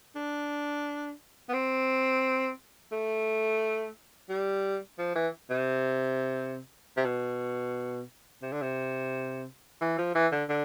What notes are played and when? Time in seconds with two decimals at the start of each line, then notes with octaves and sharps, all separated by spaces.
0.15 D4
1.49 B3
1.54 C4
2.92 A3
4.29 G3
4.98 F3
5.15 E3
5.50 C3
6.97 C3
7.05 B2
8.42 C3
8.52 D3
8.62 C3
9.81 E3
9.98 F3
10.15 E3
10.32 D3
10.49 D3